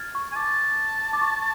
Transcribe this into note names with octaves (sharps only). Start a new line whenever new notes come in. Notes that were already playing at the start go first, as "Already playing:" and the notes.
Already playing: F6 G#6 A6
C#6
G#5
A5 D6
D6
C#6